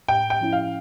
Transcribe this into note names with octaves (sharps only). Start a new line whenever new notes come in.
A2 G5
G5
F3 C#4 E4
F5